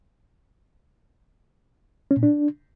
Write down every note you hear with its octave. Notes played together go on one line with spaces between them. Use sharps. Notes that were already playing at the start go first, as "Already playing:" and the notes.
C#4
A#2
D4